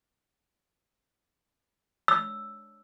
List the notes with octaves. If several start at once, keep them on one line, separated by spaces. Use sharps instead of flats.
E6